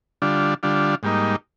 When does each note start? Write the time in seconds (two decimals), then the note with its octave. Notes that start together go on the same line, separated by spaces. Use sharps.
0.22 D3 G3 D4 F4
0.63 D3 G3 D4 F4
1.03 G#2 G3 A#3 D#4